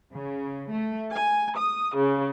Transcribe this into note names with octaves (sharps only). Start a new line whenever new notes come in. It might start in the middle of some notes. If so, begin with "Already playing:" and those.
C#3
A3
G#5
D#6
C#3